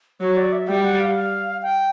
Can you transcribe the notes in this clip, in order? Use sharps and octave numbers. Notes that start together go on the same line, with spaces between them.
F#3 C#5
D5
E5
G3 G5
F#5
F5
F5
G5